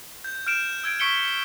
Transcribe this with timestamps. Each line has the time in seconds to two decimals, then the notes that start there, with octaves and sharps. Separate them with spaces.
0.24 G6
0.47 F6 G6 D7 E7
0.84 E6 G#6 D7
1.00 C#6 E6 B6 C#7 D7 G7